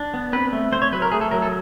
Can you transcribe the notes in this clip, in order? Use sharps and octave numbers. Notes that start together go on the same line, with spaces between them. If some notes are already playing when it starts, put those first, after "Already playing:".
Already playing: D4
B3
C4 B4
A3
A3 C5
C#5
F#3 B4
A#4
A3 G#4
A4
F#3 A#4
A4